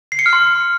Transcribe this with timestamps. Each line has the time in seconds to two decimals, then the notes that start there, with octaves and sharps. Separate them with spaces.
0.12 C7
0.19 C#7
0.26 F6
0.33 C6